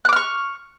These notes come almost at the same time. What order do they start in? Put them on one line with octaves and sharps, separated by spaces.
F#6 D6 F6 C#6